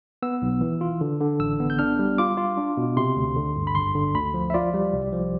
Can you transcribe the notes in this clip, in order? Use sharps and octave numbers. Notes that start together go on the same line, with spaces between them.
B3 E6
B1
E3
F4
D3
D3
A1 E6
B3
G6
D4 F6
G3
F4 D6
F4
D4
B2
C3 C6
D2
D3
G2
B5
G1 C6
D3
D2 B5
F3
E5
F4 D5
G3
C2
F3